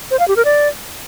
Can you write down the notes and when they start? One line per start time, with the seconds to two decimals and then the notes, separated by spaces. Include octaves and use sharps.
0.11 C5
0.19 F5
0.28 G4
0.36 A#4
0.45 D5